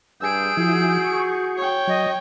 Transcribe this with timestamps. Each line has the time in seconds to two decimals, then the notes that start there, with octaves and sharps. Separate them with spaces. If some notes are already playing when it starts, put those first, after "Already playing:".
0.21 G2 G#4 E6 G6 D7
0.57 F3 E4 F#4
1.04 C#6
1.58 C#5 G5
1.87 F#3 D#5